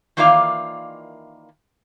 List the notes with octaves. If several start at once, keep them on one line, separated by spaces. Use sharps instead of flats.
D#3 E3 A#3 F4 D5 F5